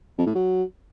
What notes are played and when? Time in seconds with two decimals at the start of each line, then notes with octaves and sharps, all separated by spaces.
0.18 F2
0.27 A2
0.35 F#3